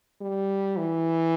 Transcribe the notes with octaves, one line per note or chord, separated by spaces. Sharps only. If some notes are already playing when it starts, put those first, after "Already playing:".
G3
E3